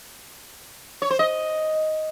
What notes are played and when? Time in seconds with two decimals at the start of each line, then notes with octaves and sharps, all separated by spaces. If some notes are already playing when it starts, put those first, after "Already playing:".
1.02 C#5
1.10 C5
1.19 D#5